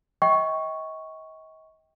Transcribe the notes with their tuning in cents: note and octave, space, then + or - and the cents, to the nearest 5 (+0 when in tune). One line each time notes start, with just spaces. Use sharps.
D#5 +40 G5 +0 C#6 +0